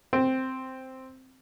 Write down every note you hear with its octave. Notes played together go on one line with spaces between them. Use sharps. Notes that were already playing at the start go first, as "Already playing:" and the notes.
C4